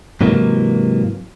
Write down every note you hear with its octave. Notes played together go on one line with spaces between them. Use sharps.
G#2 C3 E3 F#3 A#3